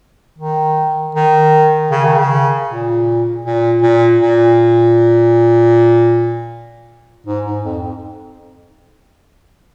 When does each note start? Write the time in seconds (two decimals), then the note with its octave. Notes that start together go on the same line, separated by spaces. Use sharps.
0.38 D#3
1.15 D#3
1.91 C#3
2.05 D#3
2.18 C#3
2.68 A#2
3.45 A#2
3.82 A#2
4.20 A#2
7.26 G#2
7.46 G#2
7.64 F2